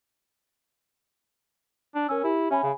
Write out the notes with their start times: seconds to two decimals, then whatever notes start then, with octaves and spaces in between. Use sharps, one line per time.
1.95 D4
2.09 C#4 A#4 G#5 E6
2.24 E4 G4
2.51 C#4 E5 G#5 B5
2.63 C#3